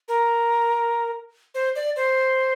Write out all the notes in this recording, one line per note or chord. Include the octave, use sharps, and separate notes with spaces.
A#4
C5
D5
C5